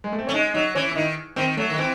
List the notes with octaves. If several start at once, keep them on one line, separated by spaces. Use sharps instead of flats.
G#3
A3
C4
A3 C#4
G#3 D#4
F#3 D#4
E3 C#4
E4
D#3 D#4
D#3 C4
F#3 A3
D#3
E3 C4